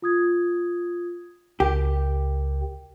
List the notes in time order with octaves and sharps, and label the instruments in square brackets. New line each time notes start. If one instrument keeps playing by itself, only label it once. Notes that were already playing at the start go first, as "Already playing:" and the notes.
[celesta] F4 D#6 G#6
[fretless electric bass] C#2 [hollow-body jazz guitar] G4 [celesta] A#4 G5